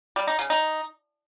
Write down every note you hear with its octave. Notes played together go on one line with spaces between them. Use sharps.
G3
D#4
C#3
D#4